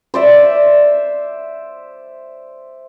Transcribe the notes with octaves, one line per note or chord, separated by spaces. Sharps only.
C5 D5 E5